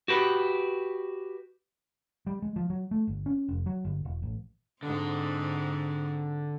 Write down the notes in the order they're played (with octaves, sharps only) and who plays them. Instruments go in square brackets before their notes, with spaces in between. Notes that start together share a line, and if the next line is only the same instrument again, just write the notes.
[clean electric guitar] F#4 G4 B4
[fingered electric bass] G3
G#3
F3
F#3
A3
G1
C#4
F1
F#3
G1
E1
A1
[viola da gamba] G#2 C4 [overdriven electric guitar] D3